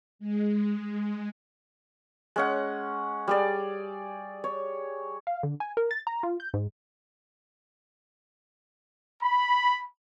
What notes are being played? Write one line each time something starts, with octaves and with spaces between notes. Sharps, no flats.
G#3
G#3 C#4 F#5
G3 G#4 D5
C#5
F5
D3
G#5
A#4
A6
A#5
F4
G6
G#2
B5